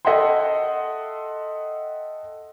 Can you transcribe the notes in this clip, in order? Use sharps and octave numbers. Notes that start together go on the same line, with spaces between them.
A4 D#5 E5 F#5 G5 C6